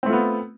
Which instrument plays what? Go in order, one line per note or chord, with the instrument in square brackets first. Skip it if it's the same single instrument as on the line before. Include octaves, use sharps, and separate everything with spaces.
[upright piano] C4
A3
F4
B3